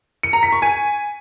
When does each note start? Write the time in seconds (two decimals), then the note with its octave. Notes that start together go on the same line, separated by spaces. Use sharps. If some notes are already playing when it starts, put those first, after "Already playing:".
0.23 C#7
0.33 A#5
0.43 B6
0.53 C#6
0.62 G#5